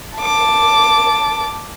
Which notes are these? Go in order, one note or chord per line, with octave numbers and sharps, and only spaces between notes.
A5 D6